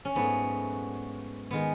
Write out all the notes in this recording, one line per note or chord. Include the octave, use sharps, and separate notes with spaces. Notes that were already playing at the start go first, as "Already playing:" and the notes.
C#4
G#2 F#3 A3 B3
D#3 G#3 B3